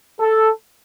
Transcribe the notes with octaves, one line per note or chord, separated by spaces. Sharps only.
A4